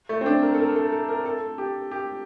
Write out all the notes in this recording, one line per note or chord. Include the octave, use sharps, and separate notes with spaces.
A3
C4
D4
A#4
A4
A#4
A4
A4
A#4
A4
G4
G4